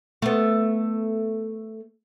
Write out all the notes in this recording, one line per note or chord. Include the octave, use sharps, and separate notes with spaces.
A3 B3